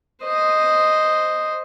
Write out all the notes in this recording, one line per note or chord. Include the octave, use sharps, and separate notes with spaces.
C5 D#5